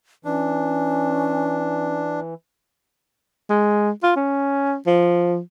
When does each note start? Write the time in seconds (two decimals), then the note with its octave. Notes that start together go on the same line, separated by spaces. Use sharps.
0.25 E3 C#4 D4
3.50 G#3
4.03 F4
4.16 C#4
4.86 F3